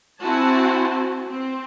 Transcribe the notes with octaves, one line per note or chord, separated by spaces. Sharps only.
C4 E4 F#4 G#5 A5
C4